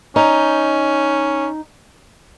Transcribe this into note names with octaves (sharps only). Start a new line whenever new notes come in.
C#4 D#4